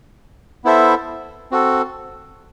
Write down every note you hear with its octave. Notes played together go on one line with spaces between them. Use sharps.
B3 E4 A4 C5 E5
C4 F#4 A4